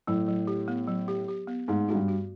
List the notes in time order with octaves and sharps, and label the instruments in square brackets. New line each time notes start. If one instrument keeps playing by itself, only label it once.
[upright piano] A2 [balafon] F#3
[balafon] F#3
G4
B3
F#3
G4
G4
B3
[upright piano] G#2 [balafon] A3
[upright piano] G#2 [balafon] F#4
[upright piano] G2
[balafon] F#4